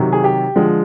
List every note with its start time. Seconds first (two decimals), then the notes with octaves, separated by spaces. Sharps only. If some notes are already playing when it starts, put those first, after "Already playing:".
Already playing: C3 D#3 F#3
0.12 G#4
0.24 G4
0.56 D3 F3 G#3